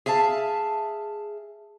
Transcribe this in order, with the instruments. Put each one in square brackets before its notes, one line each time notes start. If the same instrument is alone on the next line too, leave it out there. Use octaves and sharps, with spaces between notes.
[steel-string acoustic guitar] G#4 E5 F5 A5